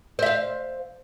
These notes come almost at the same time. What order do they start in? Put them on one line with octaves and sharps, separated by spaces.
C5 E5 F5